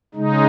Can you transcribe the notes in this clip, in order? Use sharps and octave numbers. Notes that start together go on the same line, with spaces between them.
C#3 G#3 D#4